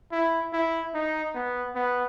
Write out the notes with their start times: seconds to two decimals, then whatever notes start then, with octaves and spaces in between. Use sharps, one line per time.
0.12 E4
0.53 E4
0.94 D#4
1.35 B3
1.75 B3